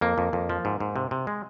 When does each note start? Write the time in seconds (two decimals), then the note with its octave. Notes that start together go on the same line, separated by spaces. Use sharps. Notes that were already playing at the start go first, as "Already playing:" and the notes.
0.01 F2 A#3
0.18 F2
0.33 F2
0.49 F3
0.65 G#2
0.80 G#2
0.96 C3
1.11 C3
1.27 G#3